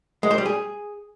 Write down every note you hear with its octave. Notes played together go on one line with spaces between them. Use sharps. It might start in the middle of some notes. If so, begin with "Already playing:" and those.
G#3
C5
G3
G#4